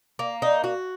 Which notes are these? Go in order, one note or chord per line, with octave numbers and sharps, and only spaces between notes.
A#3
D#4
F#4